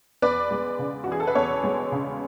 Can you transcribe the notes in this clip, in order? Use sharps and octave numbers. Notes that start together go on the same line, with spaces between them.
E2 B4 D5
G#3
C#3
F#4
E3 G#4
A4
B4
E2 A4 C#5
G#3
C#3